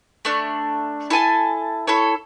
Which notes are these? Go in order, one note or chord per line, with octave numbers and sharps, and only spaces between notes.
A3 D4
E4 A4 G#5 A5
E4 A4 C#5